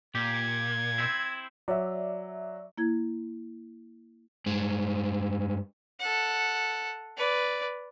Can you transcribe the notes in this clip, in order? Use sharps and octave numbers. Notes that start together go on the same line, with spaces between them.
A#2 G4 G#6
C4 E4
F#3 D5 E5
A#3 E4 G#6
G2 G#3
A4 F#5
B4 D5